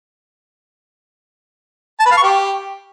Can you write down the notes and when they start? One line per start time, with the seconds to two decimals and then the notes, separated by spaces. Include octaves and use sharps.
2.00 A5
2.06 B4
2.11 F5
2.17 C#6
2.23 G4